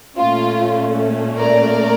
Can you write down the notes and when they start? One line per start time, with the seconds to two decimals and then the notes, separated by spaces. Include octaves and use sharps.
0.16 A#2 A3 C#4 F4
1.37 A#4 D5